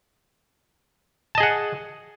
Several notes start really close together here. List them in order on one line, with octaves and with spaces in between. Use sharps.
A5 D#5 G#4 F#5